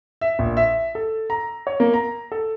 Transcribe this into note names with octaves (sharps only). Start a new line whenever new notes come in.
E5
A#1
E5
A4
A#5
C#5
A#3
A#5
A4